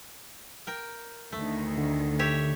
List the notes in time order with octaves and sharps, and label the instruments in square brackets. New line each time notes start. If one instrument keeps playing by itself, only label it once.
[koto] A#4 G5
[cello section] D2 D#3 [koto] A3
[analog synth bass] D3
[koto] G4 C#5 E5